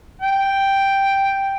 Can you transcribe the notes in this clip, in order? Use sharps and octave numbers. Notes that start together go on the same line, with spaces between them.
G5